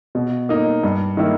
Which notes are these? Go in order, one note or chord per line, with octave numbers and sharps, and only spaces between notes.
B2
A#3 D#4
G2
D#3 A#3 E4